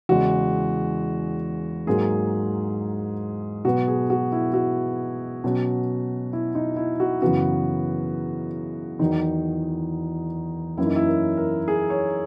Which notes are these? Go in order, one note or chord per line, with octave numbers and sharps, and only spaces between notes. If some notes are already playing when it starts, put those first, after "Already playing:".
E2 C#3 G#3 F#4
G#2 F#3 A#3 G#4
B2 F#3 B3 F#4
G#4
F#4
E4
F#4
B2 F#3 C#4
E4
D#4
E4
F#4
F#2 C#3 E3 B3 F#4
E2 D#3 F#3 D#4
F#2 E3 A#3 C#4 E4
D#4
E4
A#4
A#4
G#4
C#5